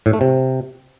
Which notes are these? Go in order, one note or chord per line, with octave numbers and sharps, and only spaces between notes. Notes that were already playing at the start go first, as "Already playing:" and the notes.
A2
A3
C3